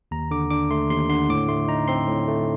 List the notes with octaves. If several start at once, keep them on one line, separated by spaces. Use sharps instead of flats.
D#2 A#5
D3 D6
D4 D6
A3 C6
D#2 C6
D3 C6
A2 D6
A3 C6
D#4 A#5
C4 C6
A2
A3